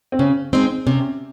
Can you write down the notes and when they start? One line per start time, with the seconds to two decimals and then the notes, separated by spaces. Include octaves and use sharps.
0.12 C4
0.19 C#3 C#4
0.53 G#3 C4 D#4
0.86 C3 C#4